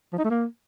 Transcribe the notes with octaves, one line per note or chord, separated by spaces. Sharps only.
F3
D#4
A3
A#3